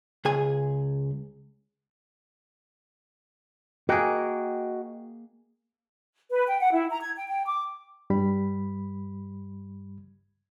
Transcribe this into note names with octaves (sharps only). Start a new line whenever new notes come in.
C#2 G#4 G#5
A#3 F#4 G#4 D#5 G5
B4
G5
F#5
E4
A#5
G#6
G5
G5
D6
G2 G3 B5